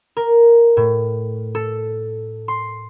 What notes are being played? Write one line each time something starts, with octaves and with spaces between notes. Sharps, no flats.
A#4
A2
A4
C6